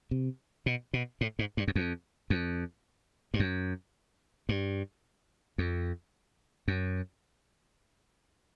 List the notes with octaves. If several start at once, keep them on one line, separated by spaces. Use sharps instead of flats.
C3
B2
B2
A2
G#2
G2
F#2
F2
F2
G2
F#2
G2
F2
F#2